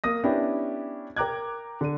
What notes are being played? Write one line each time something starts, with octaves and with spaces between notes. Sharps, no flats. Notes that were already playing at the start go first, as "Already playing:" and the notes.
A#3 D#6 A#6
B3 C#4 D4 E4 G4
A#4 G5 A#5 D6 F#6 G#6
D3 D#7